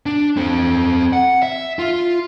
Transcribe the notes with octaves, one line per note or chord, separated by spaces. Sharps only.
D4
C4 A4
F#5
E5
F4